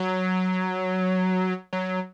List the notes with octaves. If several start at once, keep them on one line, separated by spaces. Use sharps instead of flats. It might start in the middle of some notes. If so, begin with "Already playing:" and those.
Already playing: F#3
F#3